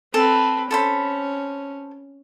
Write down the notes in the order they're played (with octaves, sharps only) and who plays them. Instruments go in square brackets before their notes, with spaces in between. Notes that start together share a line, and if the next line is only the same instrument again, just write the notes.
[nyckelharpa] C4 B4 [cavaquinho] A4
[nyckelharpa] C#4 [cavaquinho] A4 C5 B5